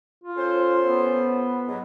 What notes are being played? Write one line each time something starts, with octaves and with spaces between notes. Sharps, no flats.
F4
C#4 A4 C5
B3
G#2 F#3